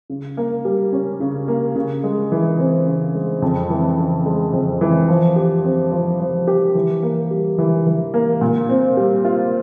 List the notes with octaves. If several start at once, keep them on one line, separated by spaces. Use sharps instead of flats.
C#3
A#3
G3
C#4
C#3
A#3
C#3
G#3
E3
C4
C#3
G#3
F2
E3
C#3
G#3
F2
E3
F3
G4
C4
F3
F3
G4
E3
A#3
G3
E3
E3
A#3
A#2
C4
G3
F4